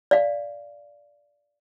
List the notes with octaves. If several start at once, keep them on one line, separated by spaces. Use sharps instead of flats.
D5 F5